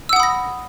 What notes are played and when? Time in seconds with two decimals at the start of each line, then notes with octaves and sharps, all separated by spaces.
0.09 E6
0.13 F#5
0.16 D#6
0.20 B5
0.23 A#6